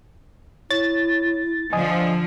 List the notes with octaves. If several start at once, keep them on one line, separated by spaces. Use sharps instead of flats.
E4 C#5 A6
D3 F3 D#5 G#5 D#6